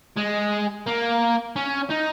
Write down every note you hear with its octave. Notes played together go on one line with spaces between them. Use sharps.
G#3
A#3
C#4
D#4